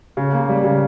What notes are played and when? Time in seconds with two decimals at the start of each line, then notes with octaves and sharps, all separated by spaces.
0.17 C#3
0.33 A#3
0.49 G3
0.64 C#3